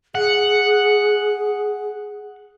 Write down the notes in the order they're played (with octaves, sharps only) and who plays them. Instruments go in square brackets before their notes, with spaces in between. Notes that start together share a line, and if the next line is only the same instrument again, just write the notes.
[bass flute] G#4 [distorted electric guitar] F#5